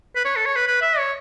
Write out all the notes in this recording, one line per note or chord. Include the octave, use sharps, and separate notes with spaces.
B4
C#5
A4
C#5
B4
B4
E5
C#5